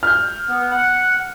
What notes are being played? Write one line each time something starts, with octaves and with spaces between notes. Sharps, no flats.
F6 G6
B3
F#5